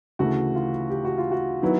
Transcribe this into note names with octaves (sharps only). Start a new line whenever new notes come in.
D2 C#3 E3 A3 F#4
F4
G4
F#4
F4
F#4
D#3 F#3 B3 E4